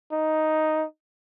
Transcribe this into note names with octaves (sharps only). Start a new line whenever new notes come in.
D#4